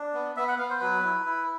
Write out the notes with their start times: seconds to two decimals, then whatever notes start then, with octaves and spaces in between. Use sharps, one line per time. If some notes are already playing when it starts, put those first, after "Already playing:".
Already playing: D4
0.14 B3
0.36 B3 E5
0.48 F#5
0.58 B3 F5
0.70 C5
0.81 F#3 B4
1.04 E4
1.26 E4